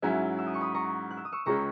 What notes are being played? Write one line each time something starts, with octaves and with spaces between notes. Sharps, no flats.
G#2 F#3 C#4 E4 E5 G#5
E6
D#6
C#6
B5 D#6
A#5 C#6
F#6
E6
D#6
C#6 E6
C#2 C#3 G#3 C#4 A#5 C#6